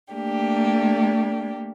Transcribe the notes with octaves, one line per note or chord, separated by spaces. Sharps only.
A3 A#3 D4 G4